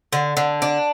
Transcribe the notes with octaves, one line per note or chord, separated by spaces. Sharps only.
D3
D3
D4